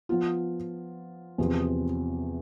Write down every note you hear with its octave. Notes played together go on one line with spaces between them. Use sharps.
F3 B3 F4
E2 C3 F3 C4